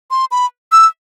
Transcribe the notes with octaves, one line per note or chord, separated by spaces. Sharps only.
C6
B5
E6